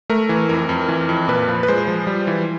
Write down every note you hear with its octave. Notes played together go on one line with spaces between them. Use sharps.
A3 A#4
E3
F2 A#4
F2
E3
F2
A#2 B4
F3
B4
G#3 C5
F3
G3
E3